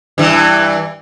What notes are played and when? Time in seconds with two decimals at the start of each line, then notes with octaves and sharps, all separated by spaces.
0.18 G2 E3